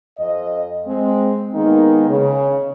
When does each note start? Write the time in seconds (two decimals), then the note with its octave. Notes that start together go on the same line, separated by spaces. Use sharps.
0.18 F2 D#5
0.87 G#3 C4
1.54 D#3 G#3 A#3 B3 D#4
2.09 C#3